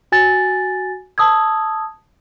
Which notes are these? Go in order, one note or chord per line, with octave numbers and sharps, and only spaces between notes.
F#4 G#5 A6
A5 D#6 E6 G#6